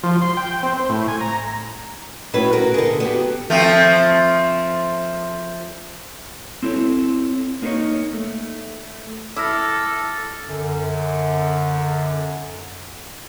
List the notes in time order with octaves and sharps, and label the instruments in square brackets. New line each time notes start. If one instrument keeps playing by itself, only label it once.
[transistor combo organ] F3
C6
G5
C4
C5
A2
G#5
A#5
[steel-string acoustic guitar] A2 F#3 C#4 B4
F#4 A#4
D3 G#4
B3 F#4 G4
[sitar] F3 A3 C4
[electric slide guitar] C4 E4 A4 C#5
A#3 D#4 F4 B4 C#5 D#5
A3
[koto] E4 [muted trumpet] A4 [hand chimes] D6 F6 A#6
[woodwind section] F#2 D3